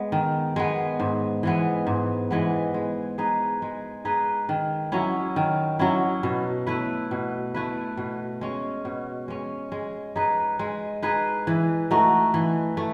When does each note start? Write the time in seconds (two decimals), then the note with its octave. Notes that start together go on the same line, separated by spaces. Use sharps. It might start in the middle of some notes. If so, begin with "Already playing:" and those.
Already playing: G#3 B3
0.12 D#3
0.56 G#3 B3
1.00 G#2
1.43 E3 G#3 B3
1.87 G#2
2.31 E3 G#3 B3
2.74 G#3
3.18 D#4 G#4 B4
3.62 G#3
4.05 D#4 G#4 B4
4.49 D#3
4.92 F#3 C#4 E4
5.36 D#3
5.79 F#3 C#4 E4
6.23 B2
6.67 A3 E4 B4
7.11 B2
7.54 A3 E4 B4
7.97 B2
8.41 G#3 C#4
8.85 B2
9.28 G#3 C#4
9.72 G#3
10.16 D#4 G#4 B4
10.59 G#3
11.02 D#4 G#4 B4
11.47 E3
11.91 A3 D#4 F#4
12.34 E3
12.77 A3